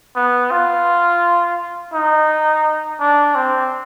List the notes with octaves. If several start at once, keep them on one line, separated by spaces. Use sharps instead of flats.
B3
F4
D#4
D4
C4